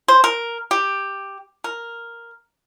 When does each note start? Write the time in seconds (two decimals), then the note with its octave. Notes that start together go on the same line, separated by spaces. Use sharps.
0.08 C5
0.24 A#4
0.71 G4
1.64 A#4